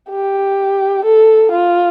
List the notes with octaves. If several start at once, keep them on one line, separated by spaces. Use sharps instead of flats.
G4
A4
F4